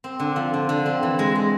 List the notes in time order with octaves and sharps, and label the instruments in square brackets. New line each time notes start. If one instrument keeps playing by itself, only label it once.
[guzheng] C4
D3
F3
D3
D3
C4
E3
G#3
G#3